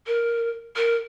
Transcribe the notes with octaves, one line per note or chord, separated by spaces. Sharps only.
A#4
A#4